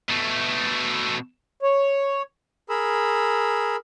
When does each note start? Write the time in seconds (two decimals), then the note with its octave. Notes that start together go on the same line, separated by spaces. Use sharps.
0.09 B2 A3
1.63 C#5
2.69 G#4 A#4 B5 E6